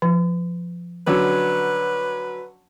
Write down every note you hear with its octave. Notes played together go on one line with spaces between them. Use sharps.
F3
D3 F#3 C#4 B4